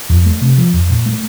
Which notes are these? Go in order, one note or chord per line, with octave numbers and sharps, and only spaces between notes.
F2
A3
C3
F3
F2
A#2
A3